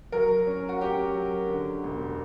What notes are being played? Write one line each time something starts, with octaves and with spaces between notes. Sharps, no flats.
F#3 A#4
C#4
F#4
C#4 G4
F#3
D3
E1